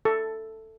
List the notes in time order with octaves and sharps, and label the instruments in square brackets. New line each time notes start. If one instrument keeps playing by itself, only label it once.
[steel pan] A4